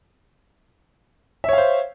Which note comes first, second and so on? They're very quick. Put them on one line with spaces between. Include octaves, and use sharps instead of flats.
E5 C#5 F5 C5